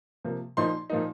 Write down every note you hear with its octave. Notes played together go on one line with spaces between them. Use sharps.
C3 F3 A#3
A#2 F3 A#3 D#4 C6
A#2 F3 A#3 D#4